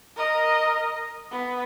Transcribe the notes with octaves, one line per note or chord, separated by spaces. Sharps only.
A#4 D#5
B3